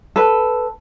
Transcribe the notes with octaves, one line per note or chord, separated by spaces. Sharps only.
A4 B4